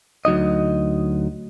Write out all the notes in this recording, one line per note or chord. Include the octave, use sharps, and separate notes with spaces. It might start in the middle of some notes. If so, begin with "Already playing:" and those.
D2 F#3 D#4 D#5